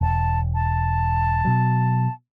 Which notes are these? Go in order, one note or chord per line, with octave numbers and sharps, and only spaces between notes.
E1 A5
A5
B2 F#3